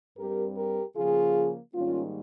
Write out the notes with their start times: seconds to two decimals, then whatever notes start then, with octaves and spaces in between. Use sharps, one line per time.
0.18 G2 G3 C4 G4 A#4
0.57 G4 A#4
0.96 C#3 F3 A#3 F4 G#4
1.74 G#2 D#3 G3 A#3 C#4 F4